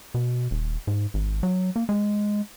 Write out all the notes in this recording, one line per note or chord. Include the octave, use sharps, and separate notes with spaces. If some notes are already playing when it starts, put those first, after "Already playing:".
B2
D#1
G#2
G#1
F#3
A#3
G#3